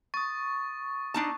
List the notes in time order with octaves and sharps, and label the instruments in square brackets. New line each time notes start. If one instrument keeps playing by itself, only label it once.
[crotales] C#6 [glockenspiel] D#6 A6
[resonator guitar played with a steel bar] D4 D#4 A5